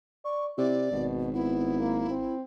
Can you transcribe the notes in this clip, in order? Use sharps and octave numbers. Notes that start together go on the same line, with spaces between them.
D5 C#6
C3 E4 D5
G#1 B2
B3 E4
A#3
C4